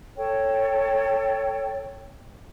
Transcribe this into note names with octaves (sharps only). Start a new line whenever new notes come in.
A4 C#5 G5